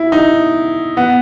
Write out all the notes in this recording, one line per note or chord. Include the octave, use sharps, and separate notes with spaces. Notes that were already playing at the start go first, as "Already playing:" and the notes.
Already playing: E4
D#4
B3